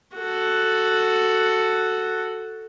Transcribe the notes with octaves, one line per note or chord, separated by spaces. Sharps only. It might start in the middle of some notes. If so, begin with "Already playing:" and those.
F#4 A4